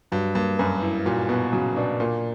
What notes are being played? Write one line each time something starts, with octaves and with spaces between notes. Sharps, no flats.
G2 F#3
G2 A#3
F#2 B4
E4
A#2 F#3
B2 B3
C#3 F#3
B2 D4
A#2 A#3